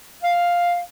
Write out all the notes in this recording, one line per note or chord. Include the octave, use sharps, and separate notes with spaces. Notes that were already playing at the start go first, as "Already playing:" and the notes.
F5